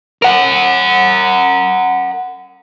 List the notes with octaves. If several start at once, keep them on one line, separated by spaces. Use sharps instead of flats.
A#4 F#5